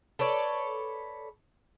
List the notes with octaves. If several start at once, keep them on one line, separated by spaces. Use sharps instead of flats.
A4 B4 C#5 D5